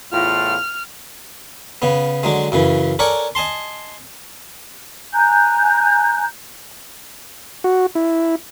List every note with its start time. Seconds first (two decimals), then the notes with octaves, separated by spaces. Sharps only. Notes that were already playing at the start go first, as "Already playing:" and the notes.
0.12 E2 A2 F4 F6
1.82 C#3 B3
2.23 D3 F#3 G#3
2.52 F#2 C#3 E3
2.99 A4 A#4 C#5 D5 F#5 G#5
3.35 D#5 G#5 A5 C6
5.13 G#5 A#5 F#6 G6
7.64 F#4
7.95 E4